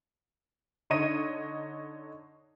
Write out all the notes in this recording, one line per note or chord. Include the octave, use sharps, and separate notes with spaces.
D3 D#4 C#5 D#5 D#7